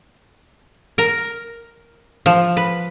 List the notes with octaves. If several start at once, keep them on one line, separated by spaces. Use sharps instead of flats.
A#4
F3
B4